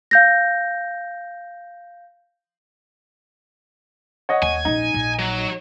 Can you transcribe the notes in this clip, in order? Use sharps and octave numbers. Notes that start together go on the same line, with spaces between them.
F5 G6 A#6
C#5 D#5 F#5
D#2 G#5
A#1 C#4 D#4
A#1
F#3